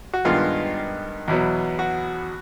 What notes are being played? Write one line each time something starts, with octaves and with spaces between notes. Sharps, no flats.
F#4
G2 D#3 G#3 B3 F4
E2 B2 F#3 B3
F#4